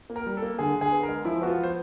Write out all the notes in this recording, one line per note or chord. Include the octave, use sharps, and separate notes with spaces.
A#3
A#4
G3
A4
A#3
D3 G#4
D3
G#4
B3
A#4
G#3
F3 E4
B3 F#4
F4
F3
C5